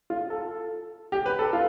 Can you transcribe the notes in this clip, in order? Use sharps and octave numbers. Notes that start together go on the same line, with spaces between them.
F4
A4
G4
B4
A4
F4